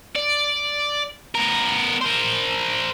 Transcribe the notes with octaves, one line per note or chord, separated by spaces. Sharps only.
D5
B3 A#4
A#4 C5